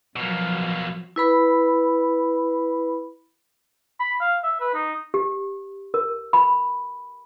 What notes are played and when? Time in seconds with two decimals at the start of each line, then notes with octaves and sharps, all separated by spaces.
0.16 B2 F3 F#3 A#3
1.16 E4 B4 B5
4.00 B5
4.21 F5
4.44 E5
4.60 B4
4.74 D#4
5.14 G4
5.94 A#4
6.33 B5